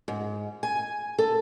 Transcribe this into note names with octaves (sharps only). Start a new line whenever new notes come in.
G#2
G#5
A4